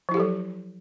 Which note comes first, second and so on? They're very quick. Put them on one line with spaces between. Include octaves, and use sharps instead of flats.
F3 E4 G4 A4 F#3